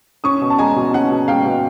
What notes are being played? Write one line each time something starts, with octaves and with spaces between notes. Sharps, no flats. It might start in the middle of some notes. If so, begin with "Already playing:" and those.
C#4 C#6 D#6
B2
A5
G#3 G#5 A#5
B2
C#4 F#5
B2
G#3 F5 G5
B2